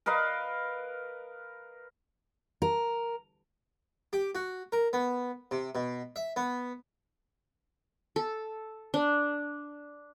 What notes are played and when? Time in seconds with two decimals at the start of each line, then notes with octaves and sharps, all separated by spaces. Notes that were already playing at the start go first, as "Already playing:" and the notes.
0.06 A#4 B4 D#5 F5
2.62 A#4
4.13 G4
4.35 F#4
4.72 A#4
4.93 B3
5.51 C3
5.75 B2
6.16 E5
6.36 B3
8.16 A4
8.94 D4